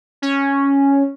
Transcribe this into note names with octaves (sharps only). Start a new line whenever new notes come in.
C#4